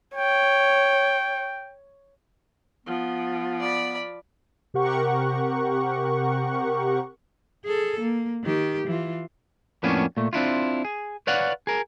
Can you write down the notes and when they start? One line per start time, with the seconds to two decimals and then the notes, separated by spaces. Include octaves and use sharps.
0.16 C#5 G5
2.86 F3 B3
3.60 D5 B5
4.74 C3 G4 A#4 F#5 C#6
7.65 G#4 A4
8.00 A#3
8.44 D#3 G4
8.87 E3 F4
9.83 F2 A2 A#3 B3 C#4 D4
10.17 A#2 A3
10.33 C4 D4 E4 F4
10.85 G#4
11.27 B4 C#5 D5 F5 F#5
11.67 G#4 A#4